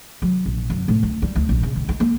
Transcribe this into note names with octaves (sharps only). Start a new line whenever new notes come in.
F#3
A#1
F#2
A2
D2
G3
D2
A#1
C#3
D#3
D#4
A#3